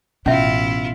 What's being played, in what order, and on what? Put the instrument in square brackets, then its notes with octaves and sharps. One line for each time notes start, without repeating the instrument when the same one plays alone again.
[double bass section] A1 [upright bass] B2 [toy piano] C#4 E5 [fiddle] E4 F4